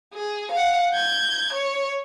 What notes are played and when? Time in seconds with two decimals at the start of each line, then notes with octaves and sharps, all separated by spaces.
0.14 G#4
0.52 F5 F#5
0.93 G6 G#6
1.53 C#5